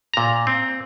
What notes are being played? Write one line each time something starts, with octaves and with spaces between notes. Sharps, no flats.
A#2 A#5
C4